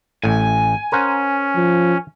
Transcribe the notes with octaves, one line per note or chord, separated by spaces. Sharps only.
A1 A2 G#5
C#4 A#4 C5 F#5
F3